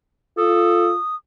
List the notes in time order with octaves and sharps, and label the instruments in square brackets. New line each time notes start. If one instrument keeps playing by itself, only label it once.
[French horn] F4 [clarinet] A4 [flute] D#6